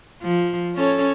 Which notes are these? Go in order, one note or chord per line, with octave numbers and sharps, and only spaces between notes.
F3
C#4 A4 C#5